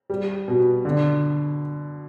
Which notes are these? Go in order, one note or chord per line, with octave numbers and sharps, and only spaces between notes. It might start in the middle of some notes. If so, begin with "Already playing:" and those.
G3
B2
D3